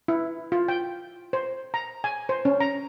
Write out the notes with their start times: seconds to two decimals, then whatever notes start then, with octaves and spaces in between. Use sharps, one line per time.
0.08 E4
0.52 F4
0.68 G5
1.33 C5
1.74 A#5
2.04 G#5
2.29 C5
2.45 C#4
2.60 A#5